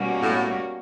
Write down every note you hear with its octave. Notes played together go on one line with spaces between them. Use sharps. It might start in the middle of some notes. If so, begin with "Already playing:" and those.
Already playing: B2 G3 A#3 C#4 F#4
A2